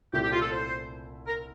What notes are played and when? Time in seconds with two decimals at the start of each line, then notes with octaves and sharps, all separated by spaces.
0.13 C2 A#2 A3 C4 E4 G4
0.23 G4
0.32 F4
0.41 A4
0.51 C5
1.27 A#4